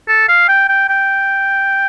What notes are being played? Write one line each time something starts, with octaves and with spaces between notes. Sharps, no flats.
A4
F5
G5
G5
G5